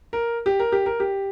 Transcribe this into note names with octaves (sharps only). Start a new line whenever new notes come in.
A#4
G4
A#4
G4
A#4
G4